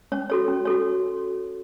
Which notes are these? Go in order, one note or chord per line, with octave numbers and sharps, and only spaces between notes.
C#4 C#5
F#4 A4 C#5
C#4
F#4 A4 C#5